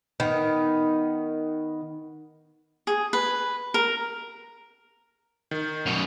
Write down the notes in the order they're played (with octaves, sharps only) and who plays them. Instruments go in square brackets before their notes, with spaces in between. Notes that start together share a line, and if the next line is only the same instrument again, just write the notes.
[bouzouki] D#3 B3
[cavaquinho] G#4
B4
A#4
[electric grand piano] D#3
[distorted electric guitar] F#2 B2